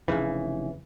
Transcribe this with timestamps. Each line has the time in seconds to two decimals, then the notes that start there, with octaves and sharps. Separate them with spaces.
0.08 F1 B1 C#3 E3